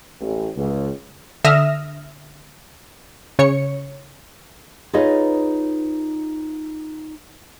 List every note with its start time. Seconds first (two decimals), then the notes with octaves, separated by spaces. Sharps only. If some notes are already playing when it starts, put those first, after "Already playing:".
0.21 A1
0.55 C#2
1.45 D3 E5 D#6 F6 A#6 E7
3.39 C#3 C#5 C#7
4.93 D#4 F4 G#4 B4 C#5 D#5